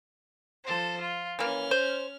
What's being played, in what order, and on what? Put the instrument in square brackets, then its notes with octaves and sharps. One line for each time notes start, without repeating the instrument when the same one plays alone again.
[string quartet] F3 A4 C5
F4
[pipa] E3 A#3 [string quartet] C#4 F6
[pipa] C5